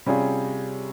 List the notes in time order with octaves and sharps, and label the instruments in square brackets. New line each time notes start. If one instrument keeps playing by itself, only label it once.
[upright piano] C3 G3 C#4 F4 G#4